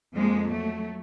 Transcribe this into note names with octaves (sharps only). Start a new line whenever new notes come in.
F2 F3 G#3 A#3
F#3 A3